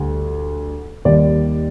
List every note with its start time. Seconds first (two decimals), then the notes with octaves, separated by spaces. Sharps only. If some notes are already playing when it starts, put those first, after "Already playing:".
Already playing: D2 D3 G3
1.05 D#2 D#3 G3 D5